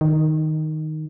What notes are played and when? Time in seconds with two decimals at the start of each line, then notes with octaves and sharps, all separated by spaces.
0.01 D#3